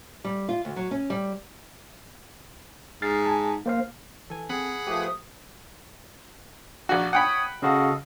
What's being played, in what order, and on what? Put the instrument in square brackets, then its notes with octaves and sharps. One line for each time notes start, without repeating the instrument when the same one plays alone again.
[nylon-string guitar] G3
F4
D2
F#3
C#4
G3
[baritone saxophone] G#2 [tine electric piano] F6 A6 C7
[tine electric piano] G#5 A5
A#3 C5 F5
[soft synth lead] E3 [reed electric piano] A4 G#5
[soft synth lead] C4 [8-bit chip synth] G#4 F#5 B5
[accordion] F3 A3 [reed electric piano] G4 B4 [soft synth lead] D#6
[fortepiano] A#1 F#4
[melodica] C#5 D#6 [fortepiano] F#5 G5 B5
[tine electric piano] C#3 F#4 [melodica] A4 D#5 F5